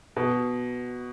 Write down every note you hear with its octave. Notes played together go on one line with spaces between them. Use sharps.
B2